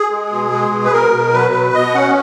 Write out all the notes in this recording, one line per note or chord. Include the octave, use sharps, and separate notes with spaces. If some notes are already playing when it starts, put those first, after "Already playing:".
Already playing: G#4
G#3
B2
G#3
B2
B4
B2 A#4
B2
F#3 B4
B2
B2 D#5
C#4 F#5